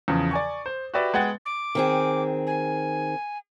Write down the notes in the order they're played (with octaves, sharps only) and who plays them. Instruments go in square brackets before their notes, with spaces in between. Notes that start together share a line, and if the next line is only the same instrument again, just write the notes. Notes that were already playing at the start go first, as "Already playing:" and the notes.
[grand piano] E2 C#3 F3
D5 G#5 C#6
C5
F#4 G4 B4 D5 E5
G#3 B3 F#5 G5 A6
[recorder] D6
[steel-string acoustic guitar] D#3 C4 G#4
[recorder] G#5